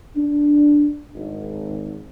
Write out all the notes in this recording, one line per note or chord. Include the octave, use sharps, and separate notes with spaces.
D4
G#1